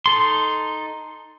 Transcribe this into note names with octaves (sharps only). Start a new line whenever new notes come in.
D#4 A4 C6